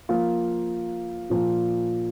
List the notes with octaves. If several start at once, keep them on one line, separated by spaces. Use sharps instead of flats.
F3 A#3 F4
A#2 F3 A#3